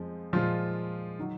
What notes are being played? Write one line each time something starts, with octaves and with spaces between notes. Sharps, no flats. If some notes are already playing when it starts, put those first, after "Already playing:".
Already playing: F2 F3 G#3
A#2 F3 G#3 F4
D#3 F#3